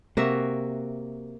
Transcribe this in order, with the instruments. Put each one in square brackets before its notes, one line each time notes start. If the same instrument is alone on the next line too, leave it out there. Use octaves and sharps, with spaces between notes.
[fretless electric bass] C3 [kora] A#3 F#4 E5